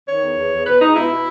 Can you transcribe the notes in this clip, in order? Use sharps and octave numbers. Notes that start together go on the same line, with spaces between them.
D#3 C#5
E2
E2
E2
B2 B4
G#3 D#4
B2 E4
B2